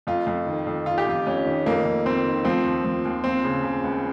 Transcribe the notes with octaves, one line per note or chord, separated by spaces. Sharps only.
F2 F4
F2
D#3
F2
D#3 F4
G4
F2 F4
F2 C#4
D#3
F2 A#3
F2
F2 C4
D#3
F3 C4
D#2
F3
D#2
F3 C4
C#3
C#3
C#2